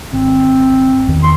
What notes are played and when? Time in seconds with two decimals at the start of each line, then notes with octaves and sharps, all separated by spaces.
0.13 G#1 C4
1.08 E2 D#3
1.23 C6